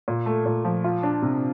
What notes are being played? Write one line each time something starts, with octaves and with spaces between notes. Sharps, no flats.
A#2
A3
A#2
F3
F4
D4
C3